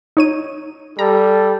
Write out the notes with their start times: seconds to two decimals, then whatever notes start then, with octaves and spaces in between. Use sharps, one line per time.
0.17 D#4 C#5 D#7
0.99 G3 A4 A#5